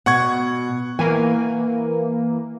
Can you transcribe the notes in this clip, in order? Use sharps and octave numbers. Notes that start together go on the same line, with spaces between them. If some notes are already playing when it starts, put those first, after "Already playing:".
B2 F#5 C#6 G#6
E3 A#3 G#5